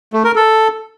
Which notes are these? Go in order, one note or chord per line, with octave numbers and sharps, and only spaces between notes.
A3
A#4
A4